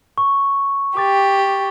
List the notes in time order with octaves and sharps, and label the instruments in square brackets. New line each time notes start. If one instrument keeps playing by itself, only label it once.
[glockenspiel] C#6
[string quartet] G4 [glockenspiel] D6 A6